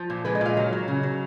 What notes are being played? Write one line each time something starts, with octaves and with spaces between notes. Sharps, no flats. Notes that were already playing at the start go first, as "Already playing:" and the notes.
Already playing: F3
A#2
G#3 B4
D#5
A#2 F5
F#3
F#3
C#3
F#3